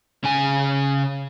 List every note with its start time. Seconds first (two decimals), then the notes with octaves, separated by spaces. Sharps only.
0.24 C#3 G#5